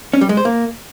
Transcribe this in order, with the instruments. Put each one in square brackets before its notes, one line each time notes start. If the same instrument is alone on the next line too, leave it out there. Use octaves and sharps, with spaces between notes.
[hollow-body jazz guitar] C#4
G3
G#3
C5
A#3